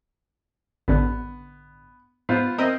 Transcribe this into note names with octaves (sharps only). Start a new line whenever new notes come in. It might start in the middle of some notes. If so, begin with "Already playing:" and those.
A1 G2 D3 B3
G#2 B3 F4 C5
C4 A#4 D#5 E5